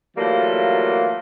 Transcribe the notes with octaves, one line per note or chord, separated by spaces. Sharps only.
E3 F#3 G3 A3 A#3 F4